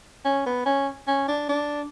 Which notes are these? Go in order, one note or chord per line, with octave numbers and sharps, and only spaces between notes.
C#4
B3
C#4
C#4
D4
D4